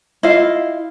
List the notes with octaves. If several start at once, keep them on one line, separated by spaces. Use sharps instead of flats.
E4 F4 D#5 F5